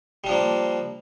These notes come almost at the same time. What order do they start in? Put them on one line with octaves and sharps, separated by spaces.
G3 D4 F3 A#3